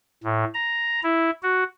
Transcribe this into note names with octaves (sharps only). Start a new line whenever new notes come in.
A2
A#5
E4
F#4